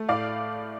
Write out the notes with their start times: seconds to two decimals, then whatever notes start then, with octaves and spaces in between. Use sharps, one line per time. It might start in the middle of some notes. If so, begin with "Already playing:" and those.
Already playing: A3
0.08 A2 D5 F5